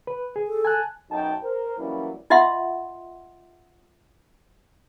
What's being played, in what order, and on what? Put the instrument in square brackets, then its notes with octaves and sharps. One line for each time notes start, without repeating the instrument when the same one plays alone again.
[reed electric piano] B4
G#4
[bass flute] A4
[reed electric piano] G#5 A5 F#6
[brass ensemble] B1 F#2 B2 D#4 G5 A5
A#4 C5
E3 F#3 G3 A#3 C#4 E4
[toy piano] F4 D#5 E5 F#5 C6